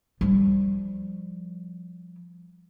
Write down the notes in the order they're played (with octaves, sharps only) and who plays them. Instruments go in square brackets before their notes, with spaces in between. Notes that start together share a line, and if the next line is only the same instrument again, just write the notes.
[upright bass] F3 G3